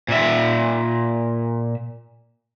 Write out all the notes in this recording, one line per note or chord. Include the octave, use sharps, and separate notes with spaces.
A#2 E5